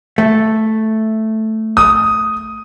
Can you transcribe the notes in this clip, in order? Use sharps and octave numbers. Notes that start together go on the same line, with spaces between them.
A3
D#6